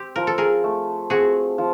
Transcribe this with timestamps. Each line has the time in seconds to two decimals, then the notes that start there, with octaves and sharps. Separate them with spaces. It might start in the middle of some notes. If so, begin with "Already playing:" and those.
Already playing: C4 G4
0.16 F3 A#4
0.27 A4
0.38 G#4 A#4
0.64 A3
1.10 C4 F#4 G#4
1.58 F3